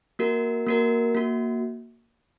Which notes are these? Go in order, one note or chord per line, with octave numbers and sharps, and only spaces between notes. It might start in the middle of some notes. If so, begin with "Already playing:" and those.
A#3 F#4 A#4
A#3 F#4 A#4
A#3 F#4